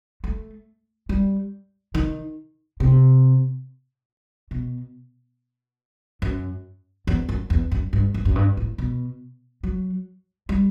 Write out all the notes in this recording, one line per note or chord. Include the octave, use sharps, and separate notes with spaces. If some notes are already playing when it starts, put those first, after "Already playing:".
A3
G3
D#3
C3
B2
F#2
E2
F#2
E2
F#2
G2
F#2
F#2
G2
A2
B2
F#3
G3